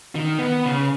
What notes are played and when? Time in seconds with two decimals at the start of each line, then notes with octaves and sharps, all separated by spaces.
0.15 D#3
0.39 B3
0.66 C#3